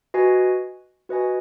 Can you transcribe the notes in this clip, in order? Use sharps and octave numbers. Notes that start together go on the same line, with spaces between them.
F#4 B4 D#5 G#5
F#4 B4 D#5 G#5